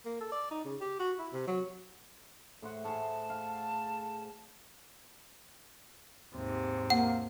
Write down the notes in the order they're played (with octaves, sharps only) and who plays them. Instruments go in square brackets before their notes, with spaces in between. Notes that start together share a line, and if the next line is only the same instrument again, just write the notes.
[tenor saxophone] A#3
A4
D5
D#4
C#3
G4
F#4
E4
C3
F#3
[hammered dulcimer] A2 C5 F#5
[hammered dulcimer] A2 G#4 [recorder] A5
[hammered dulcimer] F5 F#5
[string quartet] D#2 G#2 C3
[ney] A#3 [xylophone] F#5